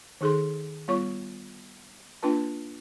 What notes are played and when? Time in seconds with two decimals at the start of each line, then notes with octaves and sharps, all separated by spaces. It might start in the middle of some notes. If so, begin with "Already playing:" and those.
0.21 D#3 D#4 G#4 A4 C6
0.88 G3 B3 F4 C#5 C#6
2.23 A#3 D4 F4 B4 A5